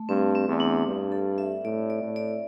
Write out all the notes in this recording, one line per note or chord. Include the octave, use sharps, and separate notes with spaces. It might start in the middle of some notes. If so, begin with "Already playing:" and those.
Already playing: A3
G2 C4
C4
E2
D4
G2
A4
E5
A2 D5
D5
A2
D5